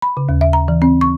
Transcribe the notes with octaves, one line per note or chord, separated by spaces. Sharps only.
B5
C#3
D#2
E5
A#5
E3
C4
C#6